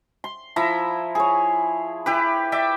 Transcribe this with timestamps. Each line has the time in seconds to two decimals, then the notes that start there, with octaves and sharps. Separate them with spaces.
0.24 C6
0.56 F3 E4 E5 A#5
1.15 G#4 C#5
2.06 E4 G4 B4
2.52 D5 E5 G5